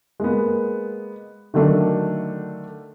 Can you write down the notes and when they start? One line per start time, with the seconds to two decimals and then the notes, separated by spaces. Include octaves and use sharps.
0.20 G#3 A#3 B3
1.54 D3 D#3 F#3 A3 D4